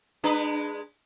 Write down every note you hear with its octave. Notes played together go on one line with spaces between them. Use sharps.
G#3 D4 B4